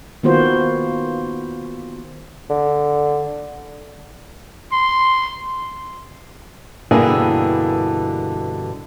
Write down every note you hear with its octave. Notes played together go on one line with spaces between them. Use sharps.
D#3 A#3 B3 F4 F#4 C5
D3
C6
G2 B2 D3 E3 A#3 G#4